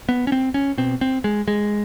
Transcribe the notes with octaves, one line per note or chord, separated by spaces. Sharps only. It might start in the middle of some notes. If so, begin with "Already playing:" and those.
B3
C#4
C4
C#4
B2 C4
C4
G#3
G#3